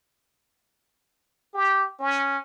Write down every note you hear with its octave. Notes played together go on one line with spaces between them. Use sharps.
G4
C#4